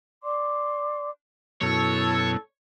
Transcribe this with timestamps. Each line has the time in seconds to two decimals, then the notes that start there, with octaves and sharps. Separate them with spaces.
0.23 D5 C6 D6
1.61 F#2 B2 E4 A4 C#5